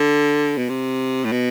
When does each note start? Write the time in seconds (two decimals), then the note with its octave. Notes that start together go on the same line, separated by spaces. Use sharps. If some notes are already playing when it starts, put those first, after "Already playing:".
Already playing: D3
0.57 B2
0.69 C3
1.25 A2
1.32 B2